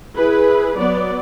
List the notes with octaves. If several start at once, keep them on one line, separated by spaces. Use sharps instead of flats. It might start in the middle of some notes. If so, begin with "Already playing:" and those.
E4 G#4 B4
F#3 B3 D5